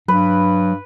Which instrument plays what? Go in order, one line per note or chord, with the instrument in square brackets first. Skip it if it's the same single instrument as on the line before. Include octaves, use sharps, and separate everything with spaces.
[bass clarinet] G2 [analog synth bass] F#3 [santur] B4